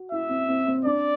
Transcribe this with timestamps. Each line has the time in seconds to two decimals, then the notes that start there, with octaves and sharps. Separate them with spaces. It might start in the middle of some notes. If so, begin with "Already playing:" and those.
Already playing: F#4
0.11 E4 E5
0.29 C4
0.48 C4
0.67 C4
0.85 D4 D5